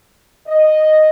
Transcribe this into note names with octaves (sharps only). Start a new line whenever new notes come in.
D#5